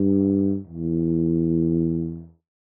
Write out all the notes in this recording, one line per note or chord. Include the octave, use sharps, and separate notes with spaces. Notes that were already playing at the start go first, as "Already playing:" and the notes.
Already playing: G2
E2